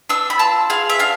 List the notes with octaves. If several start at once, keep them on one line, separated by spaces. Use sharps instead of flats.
D4 E6
B5
F4 A5
G#4 F5
E5
D4 F5